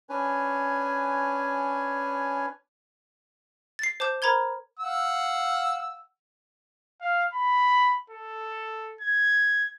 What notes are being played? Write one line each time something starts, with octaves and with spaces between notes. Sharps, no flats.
C#4 D4 B4 C#5 G#5
A6 C7
C5 A5 D6 G6
A#4 C5 A#5 B5 G#6 G7
F5 F#5 E6
F5
B5
A4
G#6